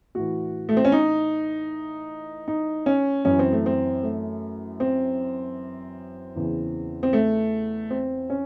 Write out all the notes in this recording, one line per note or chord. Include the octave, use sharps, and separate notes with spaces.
A2 E3 F#4
A3
C4
C#4
D#4
D#4
C#4
F#2 E3 C#4
C4
A3
C4
A3
C4
E2 C#3 E3
C4
A3
C4
C#4